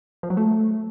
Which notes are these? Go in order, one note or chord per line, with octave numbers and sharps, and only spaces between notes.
F3
F#3
A3